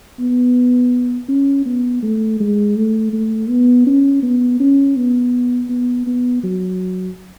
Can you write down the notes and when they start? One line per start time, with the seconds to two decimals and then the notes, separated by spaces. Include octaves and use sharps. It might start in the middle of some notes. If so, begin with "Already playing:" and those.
0.20 B3
1.29 C#4
1.66 B3
2.03 A3
2.40 G#3
2.77 A3
3.13 A3
3.49 B3
3.87 C#4
4.23 B3
4.60 C#4
4.96 B3
5.70 B3
6.07 B3
6.44 F#3